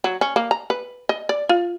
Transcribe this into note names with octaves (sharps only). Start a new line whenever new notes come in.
F#3
C#4
A#3
A#5
B4
D#5
D5
F4